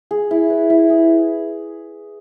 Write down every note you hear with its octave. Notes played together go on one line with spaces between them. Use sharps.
G#4
E4
B4
E4
G#4